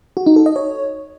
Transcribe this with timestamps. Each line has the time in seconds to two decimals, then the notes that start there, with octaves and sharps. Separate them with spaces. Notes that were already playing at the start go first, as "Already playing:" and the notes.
0.17 F#4
0.26 D#4
0.36 A4
0.46 D#5
0.56 C#5